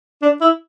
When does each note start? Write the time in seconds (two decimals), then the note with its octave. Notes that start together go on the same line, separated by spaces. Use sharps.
0.22 D4
0.41 E4